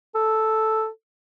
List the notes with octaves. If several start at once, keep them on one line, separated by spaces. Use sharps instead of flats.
A4